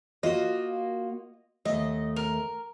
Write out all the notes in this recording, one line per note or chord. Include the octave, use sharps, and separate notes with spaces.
A#3 F4 F#4 D#5
D#2 A3 D#5
A#4